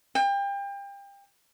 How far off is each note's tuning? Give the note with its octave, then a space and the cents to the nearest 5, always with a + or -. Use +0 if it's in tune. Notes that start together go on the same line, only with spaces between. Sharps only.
G5 +30